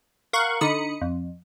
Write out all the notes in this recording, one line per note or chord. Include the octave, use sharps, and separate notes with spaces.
A#4 F5 F#5 C#6 F#6
D3 D#4 B5 D#6 C#7
F2